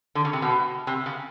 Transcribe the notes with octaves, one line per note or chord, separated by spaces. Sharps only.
D3
C#3
C3
B2
C3
C#3